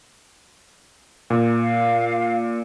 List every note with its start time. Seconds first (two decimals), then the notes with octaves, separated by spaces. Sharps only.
1.30 A#2
1.61 F5